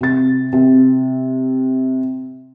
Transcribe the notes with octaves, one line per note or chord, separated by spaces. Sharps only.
C3 A6
C3